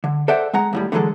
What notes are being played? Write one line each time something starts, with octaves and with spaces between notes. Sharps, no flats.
D3
A4 C5 D5 E5 F#5 G5
G#3 F#5 A#5
D#2 A2 G3
D3 E3 F#3 G#3 A4